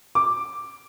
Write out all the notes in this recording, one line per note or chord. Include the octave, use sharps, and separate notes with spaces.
D6